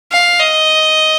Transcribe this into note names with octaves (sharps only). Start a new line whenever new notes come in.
F5
D#5